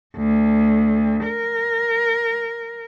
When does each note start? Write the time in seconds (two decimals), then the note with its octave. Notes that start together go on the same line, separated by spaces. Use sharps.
0.16 D2
1.25 A#4